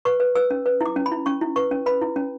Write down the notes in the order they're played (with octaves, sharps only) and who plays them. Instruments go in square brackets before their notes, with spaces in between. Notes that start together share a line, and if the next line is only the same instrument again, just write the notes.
[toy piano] B4 C#6
B4
B4 E6
C#4
B4
E4 D6
C#4
B5
E4
C#4 C#6
E4
B4 C#6
C#4
B4 B5
E4
C#4